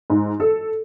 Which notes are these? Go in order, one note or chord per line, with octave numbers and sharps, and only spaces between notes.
G#2
A4